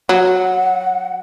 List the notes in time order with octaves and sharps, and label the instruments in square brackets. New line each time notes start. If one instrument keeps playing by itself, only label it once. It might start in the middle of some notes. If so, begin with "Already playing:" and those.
[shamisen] F#3 [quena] F#5